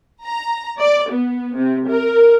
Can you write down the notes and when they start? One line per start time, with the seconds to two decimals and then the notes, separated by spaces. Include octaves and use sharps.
0.24 A#5
0.81 D5
1.12 B3
1.56 C3
1.88 A#4